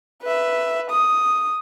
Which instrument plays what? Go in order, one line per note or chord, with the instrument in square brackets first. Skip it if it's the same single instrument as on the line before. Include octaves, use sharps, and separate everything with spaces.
[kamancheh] B4 E5
D#6